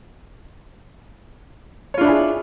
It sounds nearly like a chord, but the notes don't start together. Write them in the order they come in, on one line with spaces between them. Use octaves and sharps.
C#5 F4 D4 E4 G#4